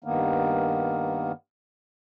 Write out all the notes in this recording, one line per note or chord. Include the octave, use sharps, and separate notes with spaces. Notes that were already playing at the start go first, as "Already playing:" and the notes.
G2 D#3 A#3 B3